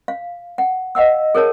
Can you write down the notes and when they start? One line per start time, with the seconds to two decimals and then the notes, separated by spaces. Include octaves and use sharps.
0.08 F5
0.58 F#5
0.95 D#5 F5 F#5 E6
1.35 G#4 A#4 C#5 A5